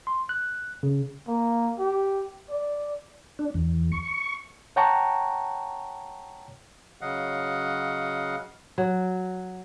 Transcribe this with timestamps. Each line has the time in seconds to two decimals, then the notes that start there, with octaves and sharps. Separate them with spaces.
0.07 C6
0.29 F#6
0.83 C#3
1.28 A#3
1.79 G4
2.50 D5
3.39 D4
3.54 E2
3.92 C#6
4.76 C#5 F#5 G5 A5 A#5 C#6
7.01 C#3 F#3 D#5 F5 F#5
8.78 F#3